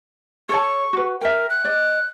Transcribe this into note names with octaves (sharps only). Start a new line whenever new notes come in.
A4 C#5 A5 C#6
F#4 B4
A#4 E5 G5
F#6
D5 D#5